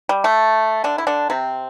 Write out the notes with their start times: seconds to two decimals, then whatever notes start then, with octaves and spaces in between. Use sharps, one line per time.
0.09 G3
0.24 A3
0.84 D3 D4
0.98 E4
1.07 D3 D4
1.30 C3 C4